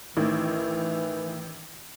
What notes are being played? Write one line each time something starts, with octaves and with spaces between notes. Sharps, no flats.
A1 D#3 E3 A3 E4